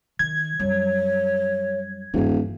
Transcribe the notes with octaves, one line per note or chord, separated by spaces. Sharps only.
D#3 G#6
F#2 G3 C#5
D#1 G2 E3